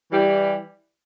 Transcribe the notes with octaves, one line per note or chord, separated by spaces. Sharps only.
E3 G3